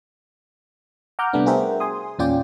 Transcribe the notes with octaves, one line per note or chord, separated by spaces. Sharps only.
F#5 A#5 D6 F6 G6
C3 G3 A3 B3 D4
F#4 G#4 A#4 C5 E5 G5
G#5 C6 D#6
E2 A#2 C#4 F4 D5 G5